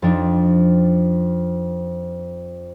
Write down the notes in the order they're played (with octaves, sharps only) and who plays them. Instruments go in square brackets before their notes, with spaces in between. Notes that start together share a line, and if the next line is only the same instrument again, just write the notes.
[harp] F2 F3 C4 D4 D#4